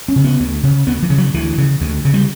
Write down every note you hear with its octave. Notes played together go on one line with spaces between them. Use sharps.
C#4
C#3
B3
D2
C#3
D2 B3
E3
C#3
F#3
D2 E3
C#3
D2
C#3
G3